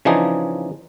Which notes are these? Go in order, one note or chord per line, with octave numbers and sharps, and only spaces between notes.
C#3 E3 F3 D4 D#4 G#4